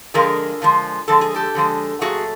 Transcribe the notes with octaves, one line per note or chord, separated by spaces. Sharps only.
D3 F3 G#3 G#4 A#4
D3 F3 G#3
D3 F3 G#3 A4
G#4
G4 A4
D3 F3 G#3
A#2 F#3 A3 F#4 G#4